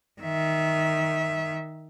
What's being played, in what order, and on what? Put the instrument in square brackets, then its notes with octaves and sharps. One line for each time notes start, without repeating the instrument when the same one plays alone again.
[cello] D#3 E5